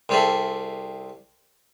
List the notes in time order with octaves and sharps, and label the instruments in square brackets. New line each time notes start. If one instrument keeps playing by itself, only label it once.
[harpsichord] C2 G3 C4 G#4 A4 E5